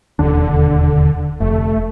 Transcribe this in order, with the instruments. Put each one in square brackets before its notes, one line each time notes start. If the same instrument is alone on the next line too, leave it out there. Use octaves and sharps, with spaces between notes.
[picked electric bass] E1 D#2 D4 [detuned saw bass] D3
[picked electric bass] F1 [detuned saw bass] A3